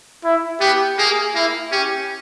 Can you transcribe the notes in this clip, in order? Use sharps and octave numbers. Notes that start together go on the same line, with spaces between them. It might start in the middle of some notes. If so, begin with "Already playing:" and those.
E4
B3 G4
A#3 G#4
A#3 E4
C#4 G4